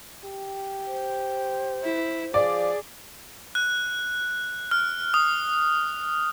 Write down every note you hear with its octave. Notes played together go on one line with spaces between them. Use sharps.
G4
C5
E4
F3 G#4 D5
F#6
F6
D#6